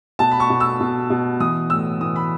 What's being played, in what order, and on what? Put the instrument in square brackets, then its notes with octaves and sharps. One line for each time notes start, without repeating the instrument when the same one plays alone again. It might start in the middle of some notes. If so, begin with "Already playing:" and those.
[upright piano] B2 A5
B5
C#6
B2
E6
B2
B2
E3 D#6
A2 E6
E3 D#6
B5